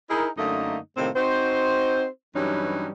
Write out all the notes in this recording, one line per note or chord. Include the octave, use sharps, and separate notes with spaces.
D#4 E4 G#4 A#4
F#2 D3 A3 A#3 D#4 D#5
A2 C3 D#3 A#3 C4
C4 D#4 F#4 C5
G2 E3 F#3 G3 C#4 D#4